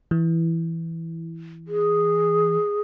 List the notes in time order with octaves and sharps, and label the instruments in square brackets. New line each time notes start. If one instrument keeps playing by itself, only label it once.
[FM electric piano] E3
[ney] G#4